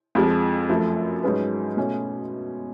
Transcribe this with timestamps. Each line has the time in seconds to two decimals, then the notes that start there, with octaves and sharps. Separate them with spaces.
0.15 F2 F3 G#3
0.69 F#2 F3 A3
1.23 G#2 F#3 C#4 G#4 B4
1.77 B2 A3 C#4